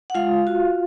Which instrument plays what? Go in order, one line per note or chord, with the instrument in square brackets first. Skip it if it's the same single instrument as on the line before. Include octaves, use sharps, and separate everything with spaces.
[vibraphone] F#5
G#3 F4 F5
F#4